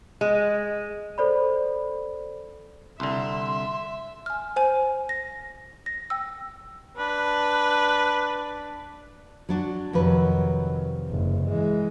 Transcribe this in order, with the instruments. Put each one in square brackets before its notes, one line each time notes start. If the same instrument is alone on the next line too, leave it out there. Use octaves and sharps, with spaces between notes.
[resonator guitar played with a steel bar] G#3
[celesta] A4 C5 D5 B5
[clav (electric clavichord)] C2 D3 [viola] E5 [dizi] C6
[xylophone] G#5 F6
C5 G#5
A#6
A#6
G5 E6
[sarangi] D4 [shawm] B4
[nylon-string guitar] F#3 D4 F#4
[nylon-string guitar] F2 C3 B4 [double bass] D#3 F#3
[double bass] F#1 G2
E3 G#3